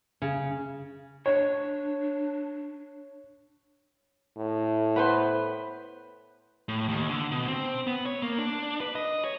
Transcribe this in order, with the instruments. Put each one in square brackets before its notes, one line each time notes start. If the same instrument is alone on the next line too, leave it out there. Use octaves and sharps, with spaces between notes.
[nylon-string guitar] C#3
[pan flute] D4 [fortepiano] C#5
[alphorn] A2
[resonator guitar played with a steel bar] B3 B4 C5
[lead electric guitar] A2
D#2
D3
B2
C4
B3
C#5
A#3
D4
B4
D#5
C#5